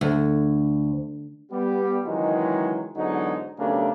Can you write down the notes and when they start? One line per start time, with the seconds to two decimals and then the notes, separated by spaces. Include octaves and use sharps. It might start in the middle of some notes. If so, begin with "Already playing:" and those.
0.01 D2
1.51 G3 B3 G4
2.05 C#2 D#3 E3 F#3 G#3
2.96 E2 G#2 D3 F#3 D#4
3.58 B1 C#3 A3 D4 G4 A#4